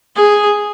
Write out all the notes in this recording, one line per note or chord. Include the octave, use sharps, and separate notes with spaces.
G#4